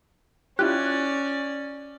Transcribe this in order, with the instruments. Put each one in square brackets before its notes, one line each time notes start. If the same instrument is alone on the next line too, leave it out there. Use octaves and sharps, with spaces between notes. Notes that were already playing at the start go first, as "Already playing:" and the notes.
[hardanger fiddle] C#4 D5 [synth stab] E4 F4 G4 [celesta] F#6